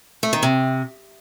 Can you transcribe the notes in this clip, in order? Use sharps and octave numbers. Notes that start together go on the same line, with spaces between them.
A3
D#3
C3